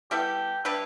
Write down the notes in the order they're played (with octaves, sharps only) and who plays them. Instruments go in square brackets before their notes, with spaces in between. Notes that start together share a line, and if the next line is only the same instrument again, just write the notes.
[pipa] G3 B3 E4 A4 [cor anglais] G4
[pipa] G3 D4 G4 B4 [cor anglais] E4